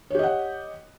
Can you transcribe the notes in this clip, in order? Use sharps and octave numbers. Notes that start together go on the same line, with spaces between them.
G4 C#5 D#5 F#5